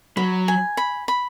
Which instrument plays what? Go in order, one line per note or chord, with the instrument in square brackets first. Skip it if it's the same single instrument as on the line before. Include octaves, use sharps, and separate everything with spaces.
[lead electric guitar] F#3 [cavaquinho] B5
[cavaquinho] G#5
B5
B5